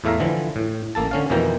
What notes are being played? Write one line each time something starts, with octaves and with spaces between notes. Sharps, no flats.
E2 A2 A3 E5 F5 A#5
D3 E3 F3
A2
A1 A#3 A4 A5
D3 C#4 F5
F2 B2 D#3 E3 A#3 G5